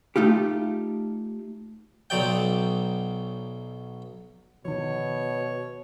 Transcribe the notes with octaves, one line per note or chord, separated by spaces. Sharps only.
A3 D#4 F4 G4
B1 B2 F#3 D5 G5
B2 D#3 F3 C#5